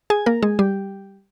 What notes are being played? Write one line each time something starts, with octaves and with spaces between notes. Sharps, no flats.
G#4 G#5
A#3 A#4
G#3 G#4
G3 G4